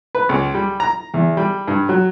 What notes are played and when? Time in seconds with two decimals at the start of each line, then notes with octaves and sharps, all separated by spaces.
0.15 B4
0.29 C#2
0.54 G3
0.80 A#5
1.14 E2
1.37 G3
1.68 G2
1.89 F#3